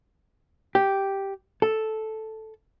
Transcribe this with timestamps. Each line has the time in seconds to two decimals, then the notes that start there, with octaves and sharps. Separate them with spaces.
0.75 G4
1.62 A4